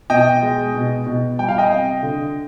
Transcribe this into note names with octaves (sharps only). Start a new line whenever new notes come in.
B2 D#5 G5
G#3
B2
B2
G3 G5
F5
D#5 G5
C3
D3